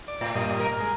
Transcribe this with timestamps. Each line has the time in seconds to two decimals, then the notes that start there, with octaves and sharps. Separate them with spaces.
0.08 D5
0.21 A2
0.35 G2 A#2 D#5
0.60 A#4
0.80 G#3